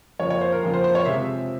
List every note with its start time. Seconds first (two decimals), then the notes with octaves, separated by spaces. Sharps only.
0.20 F2 C#3 F3 A#3 C#5
0.30 C#5
0.41 C5
0.52 A#4
0.63 F2 C#3 F3 A#3
0.74 C5
0.84 C5
0.95 C#5
1.05 C3 F3 G#3 E5